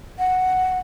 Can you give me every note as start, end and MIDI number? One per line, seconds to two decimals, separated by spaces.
0.18 0.78 78